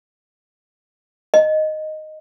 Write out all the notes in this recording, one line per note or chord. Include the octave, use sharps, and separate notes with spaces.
D#5